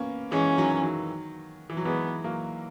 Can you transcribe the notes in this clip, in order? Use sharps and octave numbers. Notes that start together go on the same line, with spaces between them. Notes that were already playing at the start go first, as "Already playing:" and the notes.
Already playing: A#3 B3 C#4
E3 G#3 C#4
D#3 F#3
D#3 F#3
E3
F#3
E3 G#3 B3
F#3 A#3